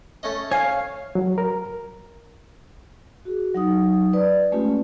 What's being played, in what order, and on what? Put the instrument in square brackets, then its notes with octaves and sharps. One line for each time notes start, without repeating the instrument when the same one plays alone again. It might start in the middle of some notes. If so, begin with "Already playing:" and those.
[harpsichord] A3 C#4 D#5
[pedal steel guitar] C#5 F5 F6 [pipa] G#5
[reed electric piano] F#3
A#4
[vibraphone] F#4 G#4
F#3 D#4 D#6
B4 D5
G#3 A3 C#4 F4 G4